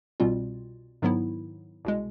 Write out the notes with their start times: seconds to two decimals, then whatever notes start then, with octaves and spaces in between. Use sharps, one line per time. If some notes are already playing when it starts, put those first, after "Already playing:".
0.20 C2 B2 G3 C4 F4
1.02 G#2 D#3 F#3 B3 E4
1.85 C2 B2 G#3